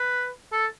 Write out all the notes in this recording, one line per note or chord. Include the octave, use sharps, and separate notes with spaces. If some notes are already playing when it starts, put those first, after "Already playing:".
Already playing: B4
A4